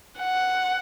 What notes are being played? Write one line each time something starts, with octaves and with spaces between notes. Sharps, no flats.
F#5